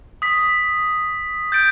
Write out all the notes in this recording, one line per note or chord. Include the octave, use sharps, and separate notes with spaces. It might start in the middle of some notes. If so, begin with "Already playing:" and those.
D#6 B6
G6 A6 D7